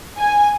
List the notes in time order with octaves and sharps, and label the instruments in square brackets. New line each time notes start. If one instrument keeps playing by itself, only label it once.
[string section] G#5